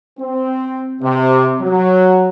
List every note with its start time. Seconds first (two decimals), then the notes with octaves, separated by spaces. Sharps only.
0.19 C4
1.01 C3
1.60 F#3